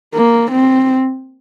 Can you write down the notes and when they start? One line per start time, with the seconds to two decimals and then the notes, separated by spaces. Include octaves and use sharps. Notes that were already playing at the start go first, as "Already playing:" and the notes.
0.14 A#3
0.52 C4